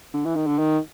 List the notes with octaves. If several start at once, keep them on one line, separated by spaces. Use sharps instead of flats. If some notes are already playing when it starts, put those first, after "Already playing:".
D3
E3
D#3
D3
D#3